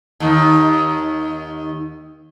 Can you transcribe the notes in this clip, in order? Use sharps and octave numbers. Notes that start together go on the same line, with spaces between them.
D#2 D#3